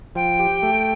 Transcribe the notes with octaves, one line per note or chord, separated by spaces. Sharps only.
F3 G5
G4
A3